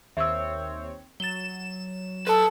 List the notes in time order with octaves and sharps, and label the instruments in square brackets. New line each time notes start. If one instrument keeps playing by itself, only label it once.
[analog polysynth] D#2 C4 C#5 [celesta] E5 E6
[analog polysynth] F#3 E7 [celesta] A6 G7
[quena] A4 [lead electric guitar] B4 A5